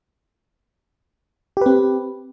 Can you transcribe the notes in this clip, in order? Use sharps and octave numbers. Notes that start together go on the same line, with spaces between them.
C4 G4 B4